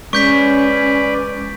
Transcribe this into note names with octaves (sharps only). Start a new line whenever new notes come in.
G#3 C#4 B4 D5 C#6 G6 B6